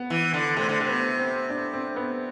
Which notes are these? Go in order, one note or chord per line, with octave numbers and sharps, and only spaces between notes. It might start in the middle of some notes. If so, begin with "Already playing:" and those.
Already playing: B3
E3
D3
C3 A3
D3
C3
B3
C4
D4
C4
B3